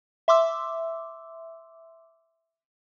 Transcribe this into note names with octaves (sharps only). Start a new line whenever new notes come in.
E5 C6 D6 E6